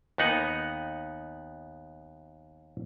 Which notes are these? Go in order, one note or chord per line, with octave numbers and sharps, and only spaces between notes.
D#2 B3 D#4 F#5 G#5